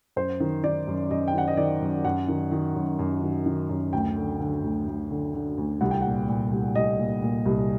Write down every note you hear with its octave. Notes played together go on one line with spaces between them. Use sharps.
F#2 C5
D#3
D#3 D5
F#2
F#2 D#5
G5
D#3 F#5
D#5
D#3 D5
F#2
F#2 F#5
D#3
D#3
F#2
F#2
D#3
D#3
F#2
D2 G5
D3
D3
D2
D2
D3
D3
D2
C2 F#5
G5
A#2 F#5
A#2
C2
C2 D#5
A#2
A#2
C2